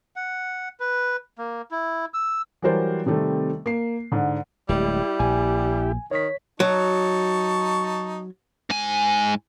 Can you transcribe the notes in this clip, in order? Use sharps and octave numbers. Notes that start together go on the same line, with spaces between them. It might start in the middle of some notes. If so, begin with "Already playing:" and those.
F#5
B4
A#3
E4
E6
E3 F#3 G3 A#4 C5 D5
C3 D#3 G3 A3 C4
A#3 C7
G#2 D3
D1 G3 G#3 E4 G4
A#1 G#5
D#3 C#5 B6
F#3 D#4 A5 C#6
G#2 G#5